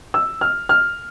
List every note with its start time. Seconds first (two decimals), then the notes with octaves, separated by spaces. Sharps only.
0.14 E6
0.41 F6
0.69 F6